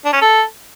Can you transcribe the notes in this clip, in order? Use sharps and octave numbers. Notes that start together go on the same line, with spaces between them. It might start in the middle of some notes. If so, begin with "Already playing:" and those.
D4
C#4
A4